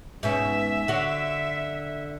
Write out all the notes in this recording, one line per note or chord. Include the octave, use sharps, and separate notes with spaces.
G#2 B2 C#4 E5
D3 F#4 C#5